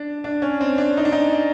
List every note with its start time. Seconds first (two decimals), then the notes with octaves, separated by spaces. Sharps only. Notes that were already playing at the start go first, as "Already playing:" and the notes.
Already playing: D4
0.24 D4
0.42 C#4
0.60 C4
0.78 D4
0.97 D#4
1.05 D4
1.12 D#4